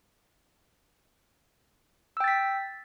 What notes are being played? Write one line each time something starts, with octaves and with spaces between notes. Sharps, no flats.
G5 E6 A6 B6